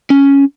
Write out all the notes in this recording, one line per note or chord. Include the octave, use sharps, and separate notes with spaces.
C#4